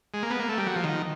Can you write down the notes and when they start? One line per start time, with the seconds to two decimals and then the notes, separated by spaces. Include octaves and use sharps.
0.14 G#3
0.23 A#3
0.30 B3
0.39 A#3
0.49 A3
0.58 G3
0.67 F#3
0.76 F3
0.84 D#3